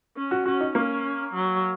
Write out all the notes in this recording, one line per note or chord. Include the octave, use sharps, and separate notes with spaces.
C#4
F#4
C#4 F#4
D#4
A#3 C#4
F#3